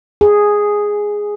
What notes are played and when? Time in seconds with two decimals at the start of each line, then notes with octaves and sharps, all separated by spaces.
0.21 G#4